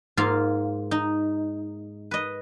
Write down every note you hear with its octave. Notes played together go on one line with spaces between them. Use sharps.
G#2 A#3 F4 F5
D#4
B4 D#5